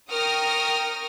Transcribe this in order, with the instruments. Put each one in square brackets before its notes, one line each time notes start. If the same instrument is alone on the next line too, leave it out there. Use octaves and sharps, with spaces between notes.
[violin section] A#4 G5 C#6 D#6 F6 A#6